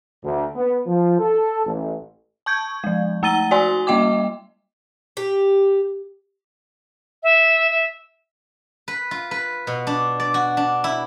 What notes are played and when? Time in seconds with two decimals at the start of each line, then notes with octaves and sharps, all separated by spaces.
0.24 D2
0.55 B3
0.86 F3
1.19 A4
1.66 A1
2.46 A5 C#6 G6 G#6
2.84 F3 G#3
3.23 A3 A#5 E6 A6 D#7 G7
3.51 F#4 D5 G#5 C6 E6
3.87 G3 A#3 D#5 G5 D6
5.17 G4
7.23 E5
7.70 E5
8.88 B4
9.11 F4
9.31 B4
9.67 B2
9.87 D4
10.20 D5
10.34 F#4
10.57 D4
10.84 E4